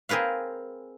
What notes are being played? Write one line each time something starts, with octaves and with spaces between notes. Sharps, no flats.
C4 G#4 A#4 B4 F5